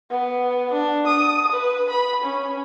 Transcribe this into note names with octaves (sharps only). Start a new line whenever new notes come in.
B3
D4
D#6
B4
B5
C#4